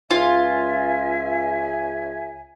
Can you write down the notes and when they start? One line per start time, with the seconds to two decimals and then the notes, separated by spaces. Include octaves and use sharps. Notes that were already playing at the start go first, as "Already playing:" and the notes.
0.11 C#2 F4 E5 G#5